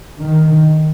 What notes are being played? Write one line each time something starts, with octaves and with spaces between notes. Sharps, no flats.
D#3